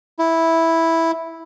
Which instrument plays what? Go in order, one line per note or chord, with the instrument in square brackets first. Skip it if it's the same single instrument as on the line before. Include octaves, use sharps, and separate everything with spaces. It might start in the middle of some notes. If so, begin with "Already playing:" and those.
[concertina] E4